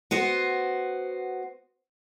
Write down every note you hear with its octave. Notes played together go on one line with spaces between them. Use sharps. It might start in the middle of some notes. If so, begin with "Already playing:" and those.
B3 F#4 C5